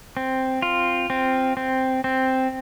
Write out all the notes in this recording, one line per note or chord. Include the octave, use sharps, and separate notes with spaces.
C4
F4
C4
C4
C4